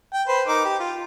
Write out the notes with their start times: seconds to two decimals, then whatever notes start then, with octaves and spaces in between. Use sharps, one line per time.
0.13 G5
0.28 B4 C5
0.48 D#4 A#4 D6
0.65 G4
0.80 F4